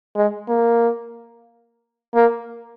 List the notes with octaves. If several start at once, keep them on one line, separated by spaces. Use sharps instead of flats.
G#3
A#3
A#3